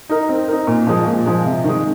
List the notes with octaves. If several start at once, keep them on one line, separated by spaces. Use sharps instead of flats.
D#4 A#4
C4
D#4 A#4
A#2
F3 G#3
A#2
F3 G#3
C3
D#3 G#3